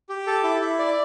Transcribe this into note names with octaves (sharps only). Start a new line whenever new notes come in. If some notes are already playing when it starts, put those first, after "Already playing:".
G4
A4
E4
E4
D5